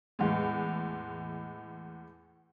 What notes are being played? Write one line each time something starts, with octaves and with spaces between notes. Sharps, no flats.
E2 A2 G#3